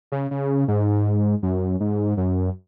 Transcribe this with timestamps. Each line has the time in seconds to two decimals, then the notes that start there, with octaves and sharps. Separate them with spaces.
0.12 C#3
0.31 C#3
0.68 G#2
1.43 F#2
1.80 G#2
2.17 F#2